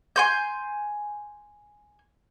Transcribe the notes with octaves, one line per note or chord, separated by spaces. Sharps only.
G#5 C6 G6